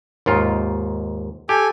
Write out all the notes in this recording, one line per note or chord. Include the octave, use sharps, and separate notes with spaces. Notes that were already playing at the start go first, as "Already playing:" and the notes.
D#2 G#2 F4
G4 A4 G#5